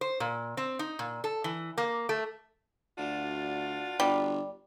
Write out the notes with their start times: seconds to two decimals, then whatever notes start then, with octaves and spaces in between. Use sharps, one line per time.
0.01 C5
0.20 A#2
0.57 C4
0.79 D#4
0.99 A#2
1.24 A4
1.44 E3
1.78 A#3
2.09 A3
2.98 D2 D4 F4 F#4
4.00 G1 G3